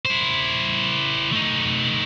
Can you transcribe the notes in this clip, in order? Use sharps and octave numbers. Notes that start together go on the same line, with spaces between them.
E4 C5
A3 D#4